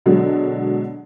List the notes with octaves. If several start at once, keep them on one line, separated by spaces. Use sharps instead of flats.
B2 D3 F#3 G#3